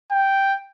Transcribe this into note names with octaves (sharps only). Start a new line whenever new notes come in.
G5